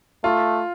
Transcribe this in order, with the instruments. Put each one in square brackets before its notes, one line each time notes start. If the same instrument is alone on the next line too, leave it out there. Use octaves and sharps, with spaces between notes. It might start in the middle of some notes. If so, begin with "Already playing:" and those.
[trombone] A3 [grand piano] F4